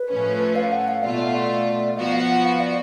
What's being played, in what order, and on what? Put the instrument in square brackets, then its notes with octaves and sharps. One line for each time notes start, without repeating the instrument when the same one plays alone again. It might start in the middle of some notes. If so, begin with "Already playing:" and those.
Already playing: [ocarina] B4
[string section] A2 F3 A3 C#4
[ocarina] F5
F#5
F5
[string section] B2 A3 F4 [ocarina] D5
[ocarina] F5
D5
[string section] F3 B3 F#4 [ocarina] F5
[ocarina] F#5
F#5
F5
D5